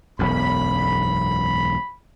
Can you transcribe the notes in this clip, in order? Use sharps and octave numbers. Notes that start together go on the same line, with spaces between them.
E1 B1 F#2 B5